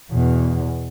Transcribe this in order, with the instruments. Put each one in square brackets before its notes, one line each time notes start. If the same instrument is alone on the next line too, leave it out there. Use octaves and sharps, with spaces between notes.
[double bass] E2 B2